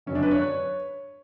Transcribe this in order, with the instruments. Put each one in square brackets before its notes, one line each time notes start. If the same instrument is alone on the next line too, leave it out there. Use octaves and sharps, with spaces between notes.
[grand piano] F#2 D3 F#3 C#4
D4
B4
C#5